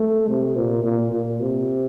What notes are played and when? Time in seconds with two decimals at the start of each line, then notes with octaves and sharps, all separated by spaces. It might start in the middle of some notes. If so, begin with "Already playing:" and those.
Already playing: A3
0.28 C3
0.56 A#2
0.84 A#2
1.12 A#2
1.40 C3